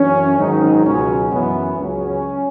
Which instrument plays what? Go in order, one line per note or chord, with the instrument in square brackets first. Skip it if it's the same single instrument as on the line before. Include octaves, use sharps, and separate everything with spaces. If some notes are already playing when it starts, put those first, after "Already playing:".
Already playing: [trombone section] F#2 E3 C#4
G#2 D#3 F#3 D#4
C#2 B2 F#3 C#4
F#2 E3 B3
C#2 C#3 F#3 C#4